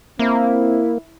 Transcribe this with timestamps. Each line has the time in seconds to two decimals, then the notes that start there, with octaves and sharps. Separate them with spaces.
0.19 A#3 C4 E4